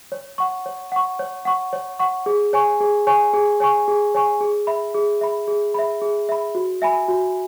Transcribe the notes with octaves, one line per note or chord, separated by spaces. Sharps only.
C#5
F#5 C#6
C#5
F#5 C#6
C#5
F#5 C#6
C#5
F#5 C#6
G#4
C#5 G#5 C#6
G#4
C#5 G#5 C#6
G#4
C#5 G#5 C#6
G#4
C#5 G#5 C#6
G#4
E5 B5
G#4
E5 B5
G#4
E5 B5
G#4
E5 B5
F#4
E5 G#5 B5
F#4